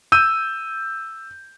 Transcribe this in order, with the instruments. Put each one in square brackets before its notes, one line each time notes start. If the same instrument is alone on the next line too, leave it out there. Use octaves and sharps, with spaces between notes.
[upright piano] E6 G6 D#7